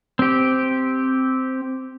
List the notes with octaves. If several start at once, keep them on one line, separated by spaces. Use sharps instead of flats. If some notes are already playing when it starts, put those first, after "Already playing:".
C4 G4